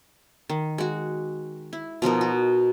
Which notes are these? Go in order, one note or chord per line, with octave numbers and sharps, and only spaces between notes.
D#3
G#3 F#4
E4
B2 F3 D#4 A#4
F#4